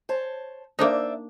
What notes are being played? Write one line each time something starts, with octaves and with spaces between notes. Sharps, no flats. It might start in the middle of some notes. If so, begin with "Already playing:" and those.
C5 C#5 A5
A#3 D4 D#4 C5 D5 E5